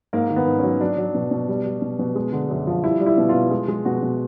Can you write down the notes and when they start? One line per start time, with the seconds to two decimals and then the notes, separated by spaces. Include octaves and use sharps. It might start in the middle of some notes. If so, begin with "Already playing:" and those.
0.13 G#2 A#3
0.30 D#3
0.36 B3
0.48 G#2
0.59 F#3 C#4
0.81 F#3 D4
0.98 F#3
1.15 B2
1.31 B2
1.48 G3
1.65 G3
1.82 B2
1.99 B2
2.15 G#3
2.32 D3
2.50 F#2
2.67 F3
2.83 G3 E4
3.00 G3
3.06 E4
3.18 B2
3.29 B2 F4
3.51 G#3 F4
3.68 G#3
3.85 B2 F#4
4.02 B2